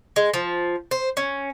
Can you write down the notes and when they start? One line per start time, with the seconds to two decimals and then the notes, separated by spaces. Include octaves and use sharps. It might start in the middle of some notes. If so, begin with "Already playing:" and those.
0.16 G#3
0.34 F3
0.91 C5
1.17 C#4